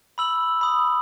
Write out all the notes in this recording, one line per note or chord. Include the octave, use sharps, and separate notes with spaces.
B5 E6 F#7
B5 D#6